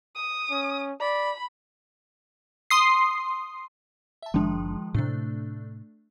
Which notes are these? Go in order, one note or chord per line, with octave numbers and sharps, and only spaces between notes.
D#6
C#4
D5 B5
C6 D#6 C7
E5 A5
F#1 D#3 F3 G#3 D4
A2 C3 A3 D4